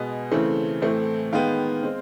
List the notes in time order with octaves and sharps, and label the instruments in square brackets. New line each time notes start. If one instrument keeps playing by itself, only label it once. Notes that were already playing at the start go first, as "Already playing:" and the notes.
Already playing: [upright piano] B2 G#3 B3 G#5
C#3 E3 A3 C4
A2 E3 A3 C4
D#3 G#3 B3 F5 G5
G#3 C4